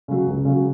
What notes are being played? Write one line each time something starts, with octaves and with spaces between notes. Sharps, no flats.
C#3 F#3
C#2
C#3 F#3